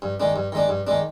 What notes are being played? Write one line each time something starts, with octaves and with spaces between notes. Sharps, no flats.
G2
D#3 G#3 D4
G2
D#3 G#3 D4
G2
D#3 G#3 D4